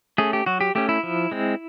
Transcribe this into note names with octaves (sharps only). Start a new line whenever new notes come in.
A3 C#4 G#4
G4
F#3 F#4
G4
A3 C#4 G4
E4
F3
G#3 C4